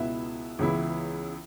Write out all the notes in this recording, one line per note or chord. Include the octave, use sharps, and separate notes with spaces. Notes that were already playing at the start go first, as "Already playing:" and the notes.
Already playing: C#2 B2 B3 E4 E5
C#2 C#3 E3 B3 E4